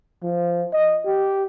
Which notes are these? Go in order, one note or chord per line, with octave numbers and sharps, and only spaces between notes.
F3
D#5
G4